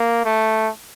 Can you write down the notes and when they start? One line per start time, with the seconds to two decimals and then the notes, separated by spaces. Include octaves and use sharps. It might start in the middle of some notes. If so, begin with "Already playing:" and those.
Already playing: A#3
0.25 A3